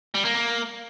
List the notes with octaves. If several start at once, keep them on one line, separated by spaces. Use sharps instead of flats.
G3
A#3
A#3